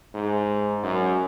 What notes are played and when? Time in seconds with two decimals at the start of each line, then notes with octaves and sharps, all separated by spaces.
0.15 G#2
0.83 F#2